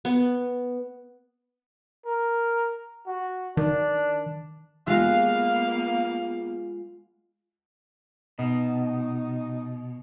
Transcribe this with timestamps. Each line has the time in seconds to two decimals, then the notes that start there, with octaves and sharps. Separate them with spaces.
0.05 B3
2.05 A#4
3.07 F#4
3.57 D#3 D4
4.87 G#3 A#3 B3 F4 F5 F#5
8.39 B2 D#4